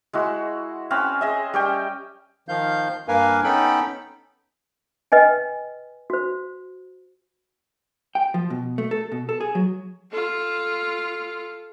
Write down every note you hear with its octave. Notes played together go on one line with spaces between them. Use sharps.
G#3 E4 F#4
C4 C#4 B4 F5
G#4 D#5 E5
G3 C#4 G5
D#3 F3 F5 G6
G2 A#3 A#4 B4 F5 G#5
B3 C#4 D#4 A4 G5 B5
B4 D#5 G5 G#5
F#4 C5
G5
F3
B2
A3
A4
B2
A4
G#4
F#3
F4 A4